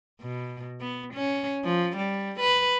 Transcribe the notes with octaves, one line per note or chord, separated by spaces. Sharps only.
B2
B3
C#4
F3
G3
B4